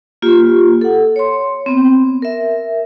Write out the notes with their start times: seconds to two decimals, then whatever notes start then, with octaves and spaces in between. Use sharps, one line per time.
0.22 A#3 F4 G4
0.81 A4 F#5
1.16 C#5 C6
1.66 B3 C4
2.22 A#4 E5